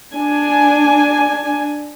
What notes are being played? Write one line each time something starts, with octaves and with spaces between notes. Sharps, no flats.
D4 G#5